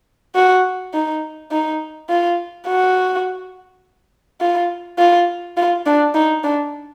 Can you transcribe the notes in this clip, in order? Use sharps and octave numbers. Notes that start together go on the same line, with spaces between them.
F#4
D#4
D#4
F4
F#4
F4
F4
F4
D4
D#4
D4